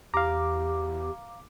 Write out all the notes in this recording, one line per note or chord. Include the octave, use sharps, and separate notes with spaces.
E2 G4 F5 A#5 D6